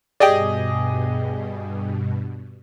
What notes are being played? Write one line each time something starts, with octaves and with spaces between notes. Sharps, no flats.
G2 B2 G4 G#4 D5 D#5 G5